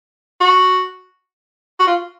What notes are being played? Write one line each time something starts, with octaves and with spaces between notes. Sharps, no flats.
F#4
F#4
F4